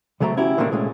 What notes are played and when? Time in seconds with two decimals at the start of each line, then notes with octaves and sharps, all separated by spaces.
0.20 C#2 C3 F#3 A3 C4 A#5
0.37 C#4 E4 F#4 G4
0.58 A#2 D3 D#3 A3 A#3 C4
0.72 C2 A#2 G#3 A3 C#4